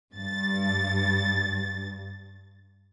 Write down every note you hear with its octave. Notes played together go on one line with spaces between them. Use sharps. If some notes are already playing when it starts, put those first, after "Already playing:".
G2 A6